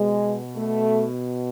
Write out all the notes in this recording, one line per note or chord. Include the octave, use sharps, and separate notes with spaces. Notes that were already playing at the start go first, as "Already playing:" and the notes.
Already playing: B2 G#3
A3